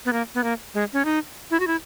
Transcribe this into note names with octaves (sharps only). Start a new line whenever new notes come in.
B3
A#3
B3
A#3
G#3
C#4
D#4
E4
F#4
E4